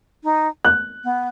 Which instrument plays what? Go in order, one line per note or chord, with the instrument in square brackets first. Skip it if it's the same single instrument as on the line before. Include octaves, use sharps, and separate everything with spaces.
[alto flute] D#4
[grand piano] F#6
[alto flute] B3